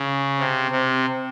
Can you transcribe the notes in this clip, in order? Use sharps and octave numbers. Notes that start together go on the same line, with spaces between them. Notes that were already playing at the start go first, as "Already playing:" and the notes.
Already playing: C#3
C3
C3